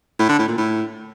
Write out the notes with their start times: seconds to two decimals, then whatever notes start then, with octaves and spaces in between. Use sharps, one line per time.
0.19 A2
0.29 D3
0.39 A2
0.49 A#2
0.58 A2